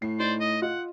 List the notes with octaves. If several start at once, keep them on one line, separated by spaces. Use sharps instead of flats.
A2 C7
D#4 C5 D5
D#5
F4 D#5 F#5